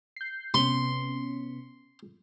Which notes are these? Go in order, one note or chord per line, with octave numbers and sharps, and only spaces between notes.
G6 C7
C3 B3 C#4 C6